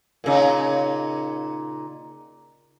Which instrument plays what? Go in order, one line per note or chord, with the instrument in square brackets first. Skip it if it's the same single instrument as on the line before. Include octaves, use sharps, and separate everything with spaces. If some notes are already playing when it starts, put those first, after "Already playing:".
[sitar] A#2 C#3 D#4